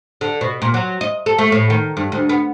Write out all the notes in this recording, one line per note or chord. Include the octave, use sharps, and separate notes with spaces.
D3
B2
A#2
F#3
D#5
A4
A3
A2
D#3
G2
D2
B3